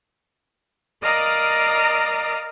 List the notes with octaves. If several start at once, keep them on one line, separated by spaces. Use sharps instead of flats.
A#4 D5 D#5 F5 A#5 D#6